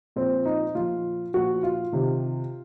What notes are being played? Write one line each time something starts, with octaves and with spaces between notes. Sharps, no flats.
A#2 F3 C4
D#4
A#2 F3 F4
A#2 F3 F#4
F4
C3 D#3